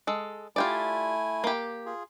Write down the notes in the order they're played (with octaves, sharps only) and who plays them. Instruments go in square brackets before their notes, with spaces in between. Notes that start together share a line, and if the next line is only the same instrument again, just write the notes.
[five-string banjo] G#3 A4
[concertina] A3 E4 G#5 [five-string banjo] F4 G4 D5
[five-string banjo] A#3 G4
[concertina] F4 G#4